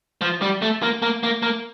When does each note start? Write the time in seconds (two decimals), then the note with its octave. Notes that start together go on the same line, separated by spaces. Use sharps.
0.21 F3
0.42 G3
0.62 A3
0.82 A#3
1.02 A#3
1.23 A#3
1.43 A#3